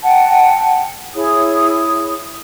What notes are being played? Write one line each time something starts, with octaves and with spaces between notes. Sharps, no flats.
F#5 G5 A5
E4 G#4 C#5 D#6